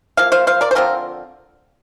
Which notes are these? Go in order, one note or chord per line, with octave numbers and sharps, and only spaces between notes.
F3 A#3 F5
C5 F5
C5 F5
A#4 D5
C5
D3 F3 C4 F4 A#4